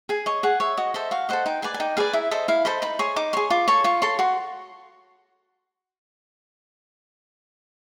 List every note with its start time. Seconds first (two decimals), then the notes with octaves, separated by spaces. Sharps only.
0.09 G#4 G#5
0.26 C#5 D#5
0.43 G#4 F#5
0.60 C#5 E5
0.77 F#4 D#5
0.94 A4 C5 D#5 E5
1.11 F#4 F5
1.29 A4 C5 D#5 F#5
1.46 D#4 G5
1.62 G#4 B4 D5 G#5
1.74 G#5
1.80 D#4 G5
1.97 G#4 B4 D5 F5
2.13 E4 E5
2.31 A4 C5 D#5 E5
2.48 E4 F5
2.65 A4 C5 D#5 B5
2.82 D#4 B5
2.99 G#4 C#5 C6
3.16 D#4 D6
3.33 G#4 C#5 C6
3.50 F4 D6
3.68 A4 C#5 C#6
3.84 F4 C#6
4.02 A4 C#5 C6
4.19 F#4 C6